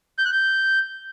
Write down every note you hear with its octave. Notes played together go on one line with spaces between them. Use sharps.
G6
F#6
G6